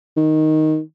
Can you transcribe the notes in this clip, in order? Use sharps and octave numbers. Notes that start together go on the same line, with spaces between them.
D#3